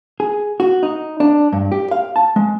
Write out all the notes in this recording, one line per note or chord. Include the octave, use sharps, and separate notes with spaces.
G#4
F#4
D#4
D4
G2
G4
F5
A5
G#3